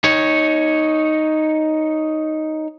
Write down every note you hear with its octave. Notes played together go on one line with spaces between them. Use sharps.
D#4 C#5